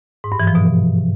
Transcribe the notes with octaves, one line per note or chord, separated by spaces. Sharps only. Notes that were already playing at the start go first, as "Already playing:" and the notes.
G#2
G2
E3
F3
B2